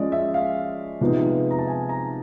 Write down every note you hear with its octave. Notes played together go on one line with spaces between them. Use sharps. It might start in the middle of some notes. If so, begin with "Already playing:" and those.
Already playing: F3 G#3 C#4 D5 D#5
E5
F5
C3 F3 G#3 B3 D#4
A#5
A5
G#5
A#5